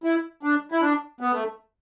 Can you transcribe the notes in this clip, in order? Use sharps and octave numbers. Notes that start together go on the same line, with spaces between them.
E4
D4
E4
D4
B3
A3